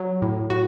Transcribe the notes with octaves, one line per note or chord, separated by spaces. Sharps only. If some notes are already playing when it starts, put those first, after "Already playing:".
Already playing: F#3
A2
A2 F#4